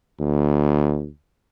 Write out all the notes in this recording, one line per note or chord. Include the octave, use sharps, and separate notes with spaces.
D2